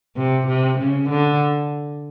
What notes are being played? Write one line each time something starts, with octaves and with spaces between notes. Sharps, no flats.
C3
C3
C#3
D3